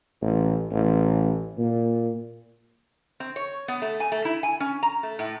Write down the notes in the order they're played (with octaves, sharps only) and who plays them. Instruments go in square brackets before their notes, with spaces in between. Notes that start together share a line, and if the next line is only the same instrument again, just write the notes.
[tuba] A1
A1
A#2
[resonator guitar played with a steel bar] C4
C#5
B3
A3
G#5
A3
E4
G#5
C#4
A#5
A3
A2